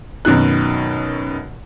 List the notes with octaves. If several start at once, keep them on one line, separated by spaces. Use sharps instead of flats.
F#2 B2 D#3 F#6